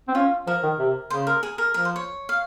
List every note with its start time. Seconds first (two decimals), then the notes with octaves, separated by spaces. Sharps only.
0.08 C4
0.14 C#4 F4
0.47 F3 A#4
0.63 D#3
0.79 C3
1.10 C#3 C5
1.27 A#4
1.43 G#4
1.58 A#4
1.74 F3 A#4
1.85 C5
1.96 C#5
2.29 F5